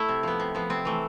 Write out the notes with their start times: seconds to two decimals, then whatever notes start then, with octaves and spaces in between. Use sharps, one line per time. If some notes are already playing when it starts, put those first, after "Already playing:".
Already playing: A3 E4
0.09 C3
0.23 F3 B3
0.40 C3
0.55 F3 B3
0.70 C3 C4
0.85 E3 A3